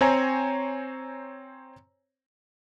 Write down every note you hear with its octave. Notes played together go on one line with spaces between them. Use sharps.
C4 C5 C#5 G#5 A#5